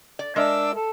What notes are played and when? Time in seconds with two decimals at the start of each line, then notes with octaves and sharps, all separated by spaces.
0.19 D5
0.36 G#3 D4 A#4 E5 D6 E6
0.73 A4